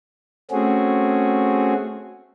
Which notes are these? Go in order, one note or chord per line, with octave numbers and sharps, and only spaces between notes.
A3 C4 C#4 F#4 G#4